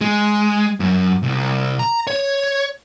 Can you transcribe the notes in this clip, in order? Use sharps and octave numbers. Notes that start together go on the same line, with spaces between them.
G#3
F#2
C2
A#5
C#5